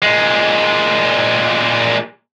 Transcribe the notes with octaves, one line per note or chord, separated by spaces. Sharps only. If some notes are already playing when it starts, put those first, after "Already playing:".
A#2 G#3